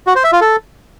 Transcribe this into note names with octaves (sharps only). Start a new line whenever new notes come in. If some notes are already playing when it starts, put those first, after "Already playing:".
F#4
C5
E5
F4
A4